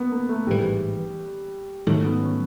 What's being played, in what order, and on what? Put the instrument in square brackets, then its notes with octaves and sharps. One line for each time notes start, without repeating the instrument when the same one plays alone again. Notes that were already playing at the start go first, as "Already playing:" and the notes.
Already playing: [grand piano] A#3 B3
A#3
A3
[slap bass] A1 G#2 E3 [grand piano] G3
[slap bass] G#2 D#3 F#3 [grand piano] A3
[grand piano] B3
C#4